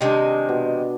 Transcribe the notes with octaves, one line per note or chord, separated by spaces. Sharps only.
C3 D#3 G#3 D4 G5
B2